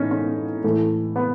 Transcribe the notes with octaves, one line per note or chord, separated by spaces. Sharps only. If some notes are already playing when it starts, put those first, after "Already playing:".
Already playing: A2 E3 C#4 D#4
C#4
A2 E3 A3
B3